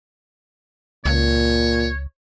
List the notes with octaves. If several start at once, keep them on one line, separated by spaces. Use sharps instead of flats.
C#2 A#2 C#5